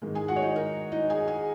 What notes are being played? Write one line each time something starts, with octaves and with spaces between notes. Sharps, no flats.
G#2 D#3 G#3
G#4 G#5
F#4 F#5
C#5
D#4 D#5
A#4
D#4 D#5
G#4 G#5
G#4 G#5